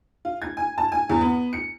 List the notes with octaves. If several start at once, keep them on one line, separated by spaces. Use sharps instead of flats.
F4
G#6
G#5
A5
G#5
E2
B3
C#7